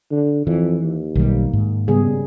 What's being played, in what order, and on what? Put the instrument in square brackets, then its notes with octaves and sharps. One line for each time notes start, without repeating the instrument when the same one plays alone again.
[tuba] D3
[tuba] F2 [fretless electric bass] E3
[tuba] D#2
[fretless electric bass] B1 G3 [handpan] D#3 A#3
[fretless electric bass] G#2
[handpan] C#3 G3 G#4 [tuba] B3